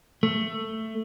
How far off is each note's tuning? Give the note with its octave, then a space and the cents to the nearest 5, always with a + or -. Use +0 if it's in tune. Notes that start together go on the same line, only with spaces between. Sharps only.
A3 +5